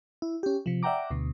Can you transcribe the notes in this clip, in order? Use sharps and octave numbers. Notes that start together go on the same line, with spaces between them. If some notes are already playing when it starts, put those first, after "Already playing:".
E4
C#4 G4
C3 F3
D5 E5 F#5 G5 A#5 D6
D2 B2